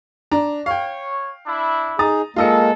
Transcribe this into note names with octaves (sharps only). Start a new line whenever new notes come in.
D4 A#5
C#5 F5 G5
D4 E4
D#4 G#4 A#5 D#6 A6
G#3 A#3 F4 A4 D#5 C#7